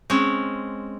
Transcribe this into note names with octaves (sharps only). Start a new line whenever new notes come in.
G#3 C4 C#4